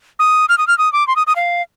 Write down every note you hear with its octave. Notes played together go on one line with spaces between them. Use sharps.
D#6
F6
D#6
F6
D#6
D6
C6
D#6
D#6
F5